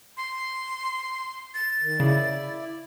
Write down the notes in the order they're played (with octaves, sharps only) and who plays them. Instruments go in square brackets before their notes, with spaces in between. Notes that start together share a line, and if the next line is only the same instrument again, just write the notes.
[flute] C6
A6
[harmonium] D#3
[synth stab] C#3 [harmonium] E4 D5